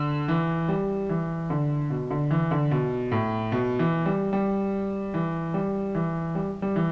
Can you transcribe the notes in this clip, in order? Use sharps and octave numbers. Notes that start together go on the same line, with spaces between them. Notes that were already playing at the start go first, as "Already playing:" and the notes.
Already playing: D3
E3
G3
E3
D3
B2
D3
E3
D3
B2
A2
B2
E3
G3
G3
E3
G3
E3
G3
G3
E3